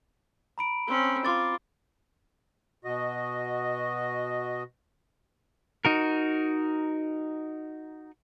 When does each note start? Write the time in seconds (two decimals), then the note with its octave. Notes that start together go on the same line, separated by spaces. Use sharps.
0.58 A#5 B5 D7
0.87 C4 C#4
1.25 F4 D6 A6
2.85 B2 F#4 D#5
5.85 D#4 F#4 A#4